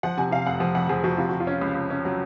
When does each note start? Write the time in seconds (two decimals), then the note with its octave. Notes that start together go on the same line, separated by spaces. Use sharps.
0.03 F3 F#5
0.17 C3 G#5
0.31 C3 F5
0.46 F1 F#5
0.60 F3 F#5
0.75 F2 F#5
0.89 F3 G#4
1.04 F3 F#4
1.18 C3 F4
1.29 C3 F#4
1.40 F4
1.47 C#4
1.61 C#2
1.75 C#2
1.90 C#4
2.05 F#3